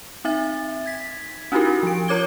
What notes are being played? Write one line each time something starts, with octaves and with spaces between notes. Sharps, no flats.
C4 D#4 E5 A6
G#6 B6
C#4 D#4 E4 F#4 G4 A#4
F3 D7
F4 A#4 C#5 D6 G#6 G7